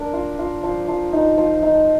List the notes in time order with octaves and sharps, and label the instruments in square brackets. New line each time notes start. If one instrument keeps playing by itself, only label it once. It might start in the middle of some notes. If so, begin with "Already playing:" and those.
Already playing: [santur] D4 A#4
F4
F4
F3
F3
D#4
F3
D#4